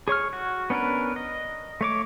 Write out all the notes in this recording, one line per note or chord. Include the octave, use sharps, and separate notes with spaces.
G#4 C#5 C#6 F6
F#4
B3 C#4 D4 A#4 B4
D#5
A3 C#5 D6